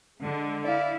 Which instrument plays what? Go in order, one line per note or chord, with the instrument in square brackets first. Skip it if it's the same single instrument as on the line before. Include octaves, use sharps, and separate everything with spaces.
[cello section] D3 G#3
[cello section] E4 [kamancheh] D5 F5